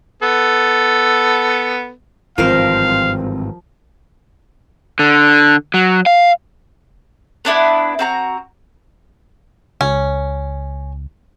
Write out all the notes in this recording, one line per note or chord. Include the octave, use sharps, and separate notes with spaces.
B3 A4
G#1 G2 E3 F3 C4 A#4 C5 F5
D3
F#3
F5
B3 D4 E4 B4
C4 F#4 A#5
C#2 C#4